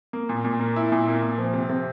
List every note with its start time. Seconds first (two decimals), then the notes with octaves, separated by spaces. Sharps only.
0.13 A#3
0.29 A#2
0.45 A#2
0.59 A#3
0.76 E4
0.92 A#2
1.07 A#3
1.22 A#2
1.38 F3
1.53 C3
1.69 C3